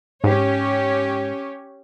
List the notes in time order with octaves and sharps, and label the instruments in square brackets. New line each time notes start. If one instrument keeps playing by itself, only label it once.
[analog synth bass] G#2 [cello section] C#4 G4 C#5